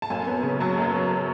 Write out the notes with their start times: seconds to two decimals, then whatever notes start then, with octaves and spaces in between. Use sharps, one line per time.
0.02 A5
0.10 F#2 G#5
0.27 B3
0.43 C#3
0.60 F#3 A5
0.78 F#2
0.94 F#3